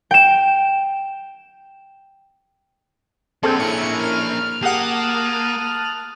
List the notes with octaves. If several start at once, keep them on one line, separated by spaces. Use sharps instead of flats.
G5 E7
A#3 C4 D4 G#4 A4
C#4 E4 A#4 C#7
F6
A#3 G4 G#4 F#5 A5 D#6 F#6